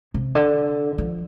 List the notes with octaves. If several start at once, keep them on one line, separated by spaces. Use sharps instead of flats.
C3
D3
F3